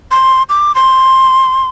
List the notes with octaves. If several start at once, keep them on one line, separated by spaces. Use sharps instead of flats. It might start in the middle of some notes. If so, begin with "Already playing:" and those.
C6
D6
C6